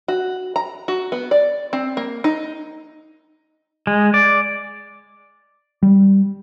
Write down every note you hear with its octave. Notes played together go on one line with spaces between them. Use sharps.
F#4
A#5
F#4
B3
D5
C4
A#3
D#4
G#3
D5
G3